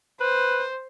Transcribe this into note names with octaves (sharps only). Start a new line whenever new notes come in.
B4 C5